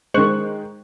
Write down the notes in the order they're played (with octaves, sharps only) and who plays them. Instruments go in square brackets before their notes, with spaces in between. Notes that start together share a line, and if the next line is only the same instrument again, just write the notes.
[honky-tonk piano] D#3 G#3 [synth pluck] C5 C#6 F#6